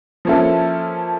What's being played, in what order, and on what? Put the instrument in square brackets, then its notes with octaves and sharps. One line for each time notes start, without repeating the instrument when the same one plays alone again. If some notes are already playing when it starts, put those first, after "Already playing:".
[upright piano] F3 A#3 C#4 E4 A4